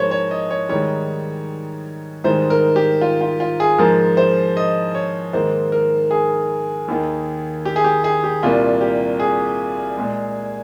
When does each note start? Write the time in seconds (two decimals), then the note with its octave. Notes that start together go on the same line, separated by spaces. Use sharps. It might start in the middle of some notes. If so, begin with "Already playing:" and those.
Already playing: G#2 F3 A#3 C5 C#5
0.11 C#5
0.31 D#5
0.51 C#5
0.69 G#2 D#3 G3 C#5
2.24 G#2 D#3 G3 C5
2.50 A#4
2.76 G4
3.01 F4
3.21 F4
3.40 F4
3.60 G#4
3.78 G#2 F3 A#3 A#4
4.17 C5
4.57 D#5
4.95 C#5
5.33 G#2 D#3 A#3 C5
5.72 A#4
6.11 G#4
6.88 D#2 D#3 A#3
7.65 G4
7.76 G#4
7.84 G4
8.04 G#4
8.24 G4
8.43 C2 A#2 G3 A#3 F4
8.81 G4
9.20 G#4
9.97 A#2 G#3